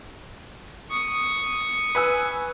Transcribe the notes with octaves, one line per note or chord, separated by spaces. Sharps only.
C#6 D#6
B4 G#5 E6